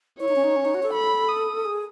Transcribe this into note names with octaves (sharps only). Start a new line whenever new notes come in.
E4 C#5
D#4
C#4
D#4
C#4
D#4
F#4
A4
B5
D#6
G#4